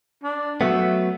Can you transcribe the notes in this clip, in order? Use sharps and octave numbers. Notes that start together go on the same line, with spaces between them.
D4
F#3 A3 B3 E5